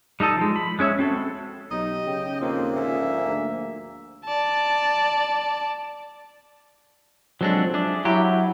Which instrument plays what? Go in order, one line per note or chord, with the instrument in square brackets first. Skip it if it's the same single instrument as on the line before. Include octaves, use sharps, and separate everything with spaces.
[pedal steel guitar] G3 D#4 A4 D#5 A5
F3 G#3
B5
G#3 C#4 C#5 E5
C4 F#4 A4
[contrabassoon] B1 [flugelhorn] D#4 [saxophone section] G4 D#5
[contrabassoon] C#3 [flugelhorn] G5
[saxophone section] D#2 A2 F3 [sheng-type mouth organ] A#3 [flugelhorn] C4
[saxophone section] G#2 D3 F3 [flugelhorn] E5
[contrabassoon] D2
[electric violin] D5 A5
[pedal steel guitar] F3 C4 A4 [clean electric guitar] F#3 G#3 D4
[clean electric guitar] D4 [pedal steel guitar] G#4 E5 D6
[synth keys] F#3 [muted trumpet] E4 [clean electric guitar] G4